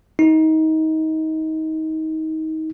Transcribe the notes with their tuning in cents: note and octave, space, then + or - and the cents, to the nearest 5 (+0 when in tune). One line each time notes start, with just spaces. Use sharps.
D#4 +25